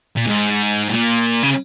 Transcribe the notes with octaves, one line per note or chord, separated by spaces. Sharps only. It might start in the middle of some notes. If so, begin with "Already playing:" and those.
A#2
G#2
A#2
C#3